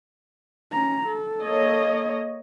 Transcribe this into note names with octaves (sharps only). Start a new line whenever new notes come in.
C#4 A#5
A4
A#3 C#5 D#5